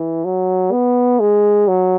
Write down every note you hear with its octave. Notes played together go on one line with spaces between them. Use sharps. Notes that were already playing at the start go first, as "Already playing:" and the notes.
Already playing: E3
F#3
B3
G#3
F#3